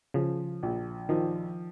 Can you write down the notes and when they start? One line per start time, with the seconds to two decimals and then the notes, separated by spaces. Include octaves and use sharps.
0.14 C#3 F3
0.63 A#1
1.09 D#3 F3